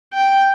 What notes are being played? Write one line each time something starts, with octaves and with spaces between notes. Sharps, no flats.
G5